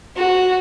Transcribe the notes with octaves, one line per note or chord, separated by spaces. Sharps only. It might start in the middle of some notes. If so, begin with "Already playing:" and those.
F#4